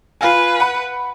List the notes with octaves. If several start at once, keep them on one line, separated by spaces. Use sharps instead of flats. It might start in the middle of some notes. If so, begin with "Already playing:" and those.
F4 B4 F5 G#5
F#5 B5